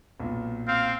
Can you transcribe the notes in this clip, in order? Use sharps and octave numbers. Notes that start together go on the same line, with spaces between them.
B1 A#2
C4 F5